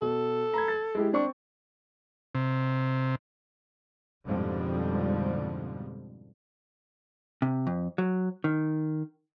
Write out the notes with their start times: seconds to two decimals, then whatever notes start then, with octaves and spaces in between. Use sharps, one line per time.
0.02 B2 A4
0.54 A#5 B5 G#6
0.68 A6
0.95 G#3 E4 G4
1.13 C4 D4 C#6
2.35 C3
4.26 F2 G#2 B2 D3 F3 G3
7.42 C3
7.67 F2
7.98 F#3
8.44 D#3